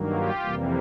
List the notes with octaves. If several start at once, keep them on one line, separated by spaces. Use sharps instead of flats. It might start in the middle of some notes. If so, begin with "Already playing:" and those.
Already playing: G2 D#3 F#3 A#3
F4 G4
F2 C3 E3 G3 A#3